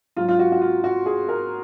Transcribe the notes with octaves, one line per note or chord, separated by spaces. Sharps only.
G#2 F#3 F4
F4
F#4
F#4
F4
F#4
G#4
A#4